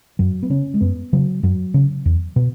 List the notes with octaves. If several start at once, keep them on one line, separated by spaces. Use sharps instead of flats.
F#2 F#3
B3
C#3 C#4
G#3
F#2 B3
C#3 F#3
F#2 F#3
C#3
E2
B2